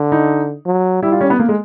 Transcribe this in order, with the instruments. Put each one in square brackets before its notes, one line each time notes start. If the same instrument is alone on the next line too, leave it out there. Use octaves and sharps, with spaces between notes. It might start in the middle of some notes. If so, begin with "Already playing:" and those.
Already playing: [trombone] D3
[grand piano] D#4
[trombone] F#3
[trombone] G3 [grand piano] E4
[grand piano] F4
C#4
B3
A#3
G#3